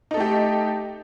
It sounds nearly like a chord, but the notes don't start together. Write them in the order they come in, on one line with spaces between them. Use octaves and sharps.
D#4 A4 A3 G4